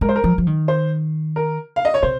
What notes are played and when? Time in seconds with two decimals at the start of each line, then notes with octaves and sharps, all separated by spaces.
0.01 G#3 A#4
0.09 C5
0.16 A#4
0.24 F3
0.38 F3
0.47 D#3
0.68 C5
1.36 A#4
1.76 F5
1.85 D#5
1.94 C#5
2.03 C3 C5